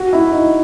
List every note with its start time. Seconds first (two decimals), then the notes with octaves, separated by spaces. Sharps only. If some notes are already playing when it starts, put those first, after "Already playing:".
Already playing: F#4
0.13 E4
0.31 D#4